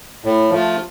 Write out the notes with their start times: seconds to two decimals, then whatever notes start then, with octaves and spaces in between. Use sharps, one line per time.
0.25 A2
0.50 F3 A3 F4